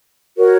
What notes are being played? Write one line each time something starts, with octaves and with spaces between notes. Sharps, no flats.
F#4 A#4 C#5